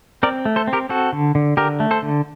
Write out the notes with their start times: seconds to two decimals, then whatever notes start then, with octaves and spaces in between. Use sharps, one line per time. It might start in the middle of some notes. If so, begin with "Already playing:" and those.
0.23 C4 A#4 D5
0.45 A3
0.56 A4 C5
0.68 C4
0.73 G4 A#4
0.89 C4 F#4 A4
1.13 D3
1.35 D3
1.57 D3 G4 A#4
1.80 A3
1.91 A4 C5
2.02 D3